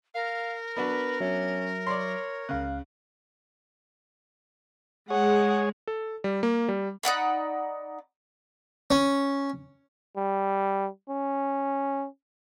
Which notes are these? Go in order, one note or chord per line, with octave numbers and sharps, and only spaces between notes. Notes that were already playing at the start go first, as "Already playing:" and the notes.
A#4 F5
B3 D4 F#4 B4
F#3 C#4 E5
C#5 D5 C6
C#2 C#3 F5 F#6
G#3 G#4 C#5 F#5
A4
G3
A#3
G3
D#4 D5 F#5 B5
C#4
G3
C#4